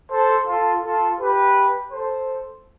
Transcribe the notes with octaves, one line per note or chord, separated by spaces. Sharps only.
A4 C5
F4 A4
F4 A4
G4 B4
A4 C5